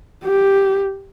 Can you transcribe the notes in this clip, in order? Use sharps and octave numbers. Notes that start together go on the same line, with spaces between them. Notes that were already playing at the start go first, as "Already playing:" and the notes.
G4